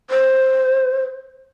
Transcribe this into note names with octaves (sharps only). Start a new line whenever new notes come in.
C5